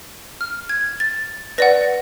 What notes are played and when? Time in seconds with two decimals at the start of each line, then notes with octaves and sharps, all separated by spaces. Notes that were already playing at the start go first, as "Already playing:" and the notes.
0.41 F6
0.69 G#6
1.00 A6
1.58 B4 D5 F#5 A#6